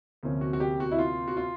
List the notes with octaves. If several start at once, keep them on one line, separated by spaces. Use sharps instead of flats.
D2 C3 F3 A#3 C#4
F#4
F#4
G4
F#4
E4
F4
F#4
F4